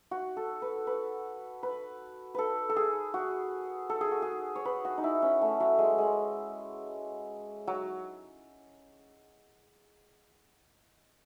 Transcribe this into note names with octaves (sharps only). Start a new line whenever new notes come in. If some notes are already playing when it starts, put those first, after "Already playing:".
F#4
A4
B4
B4
B4
A4 B4
A4
G#4
F#4
A4
G#4
F#4
G#4
C#5
B4
F#4
D#4
E4
C#4
A3
F#3
G#3
G#3
F#3